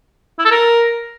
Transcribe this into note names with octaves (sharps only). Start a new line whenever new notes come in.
E4
A4
A#4